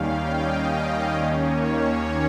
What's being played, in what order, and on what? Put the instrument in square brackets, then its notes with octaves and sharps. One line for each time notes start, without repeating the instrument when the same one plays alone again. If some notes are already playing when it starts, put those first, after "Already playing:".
Already playing: [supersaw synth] D#2 D#3 G3 C#4 F5 G5
D#5
D#5
D#2 D#3 A#3 C#4 C#5